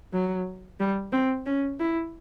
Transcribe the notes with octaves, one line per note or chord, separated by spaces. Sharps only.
F#3
G3
C4
C#4
E4